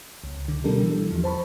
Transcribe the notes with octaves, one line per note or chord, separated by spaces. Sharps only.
C#2
D3
B2 G3 D4 G4 A4 A#4
E3
E2 F3
C5 A5 B5 C#6